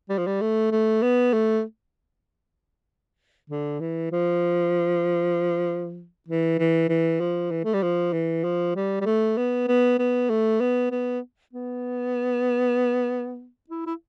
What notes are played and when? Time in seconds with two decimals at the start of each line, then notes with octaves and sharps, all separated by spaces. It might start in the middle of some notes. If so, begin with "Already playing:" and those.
0.09 G3
0.18 F3
0.27 G3
0.41 A3
0.72 A3
1.03 B3
1.34 A3
3.50 D3
3.80 E3
4.12 F3
6.28 E3
6.59 E3
6.89 E3
7.20 F3
7.51 E3
7.65 A3
7.74 G3
7.83 F3
8.13 E3
8.44 F3
8.76 G3
9.01 G3
9.06 A3
9.38 B3
9.68 B3
9.99 B3
10.30 A3
10.61 B3
10.91 B3
11.54 B3
13.70 E4
13.86 E4